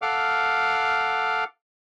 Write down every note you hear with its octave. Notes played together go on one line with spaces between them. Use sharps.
A4 F5 F#5 D6 F6